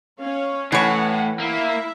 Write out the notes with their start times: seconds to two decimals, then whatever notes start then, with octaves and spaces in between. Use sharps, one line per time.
0.21 C#4 C#5 F5
0.72 A2 E3 B4 C#5 F#5
1.39 A#3 E4 E5